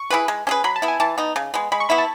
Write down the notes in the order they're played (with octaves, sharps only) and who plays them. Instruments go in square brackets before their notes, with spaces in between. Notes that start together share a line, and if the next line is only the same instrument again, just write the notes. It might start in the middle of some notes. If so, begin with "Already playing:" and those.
Already playing: [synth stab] C#6
[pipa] E4 G#4 B4
G#3
C#4 G#4 B4
[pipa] F#3 [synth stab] B5
[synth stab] A5
[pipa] B3 E4
[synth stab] G#5
[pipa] E3 [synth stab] A5
[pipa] B3 D#4
C#3
G#3 B3
[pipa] G#3 [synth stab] B5
[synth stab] C#6
[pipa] B3 E4 [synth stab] B5
[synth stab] A5